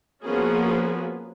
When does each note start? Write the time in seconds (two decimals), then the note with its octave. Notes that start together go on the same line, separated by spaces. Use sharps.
0.23 F3 A#3 B3 C#4 F#4 G#4